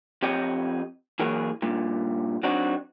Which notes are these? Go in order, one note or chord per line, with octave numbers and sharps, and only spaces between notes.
F2 C4 G4 C#5 D#5 G5
E3 F#3 A#3 G#4 C#5
G2 A#2
F#3 C4 D4 D#4 F#4